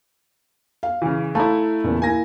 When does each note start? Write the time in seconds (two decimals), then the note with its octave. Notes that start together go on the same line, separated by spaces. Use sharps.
0.83 F5
1.02 C#3 E3
1.35 A3 E4 F5 A5 A#5
1.84 E2 A#2 C#3
2.02 A#3 E4 G#5 A#6